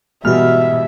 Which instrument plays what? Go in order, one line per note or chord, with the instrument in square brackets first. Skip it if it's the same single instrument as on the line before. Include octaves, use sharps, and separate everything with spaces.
[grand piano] G#2 E3 G3 [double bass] B2 [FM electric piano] F#4 F6 [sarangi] E5